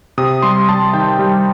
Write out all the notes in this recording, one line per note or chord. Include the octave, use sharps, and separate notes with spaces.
C3 D#6
G3 C6
G3 A5
D#3 G5
G3